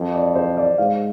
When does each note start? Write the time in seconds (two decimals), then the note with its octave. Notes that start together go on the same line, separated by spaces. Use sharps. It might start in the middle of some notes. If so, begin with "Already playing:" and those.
Already playing: F2
0.14 D5
0.35 C5
0.57 D5
0.78 G#2 F5